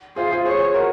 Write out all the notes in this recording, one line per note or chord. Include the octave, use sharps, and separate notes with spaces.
F4 G#4 C5
F4 G#4
G#4 C5 C#5
F#4 A#4